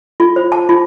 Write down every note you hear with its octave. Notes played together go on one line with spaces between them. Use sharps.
F4
C5
A5
F4